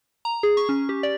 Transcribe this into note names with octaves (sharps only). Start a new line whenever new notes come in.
A#5
G#4
C#6
C#4
G4
D5